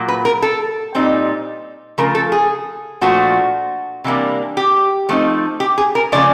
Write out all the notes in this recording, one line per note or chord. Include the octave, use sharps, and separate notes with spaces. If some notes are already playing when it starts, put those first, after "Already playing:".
Already playing: A#2 F#3 A#3
B4
A#4
A4
A#2 G3 C4 D#4
C#3 F3 A3 A#4
A4
G#4
A#2 F3 A3 D4 F#4
C3 E3 G3 A#3 D4
G4
F3 A3 C4 D#4
G4
G#4
A#4
C#3 F3 A3 C#4 D5